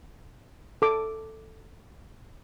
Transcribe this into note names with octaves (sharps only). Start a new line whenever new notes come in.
A4 D6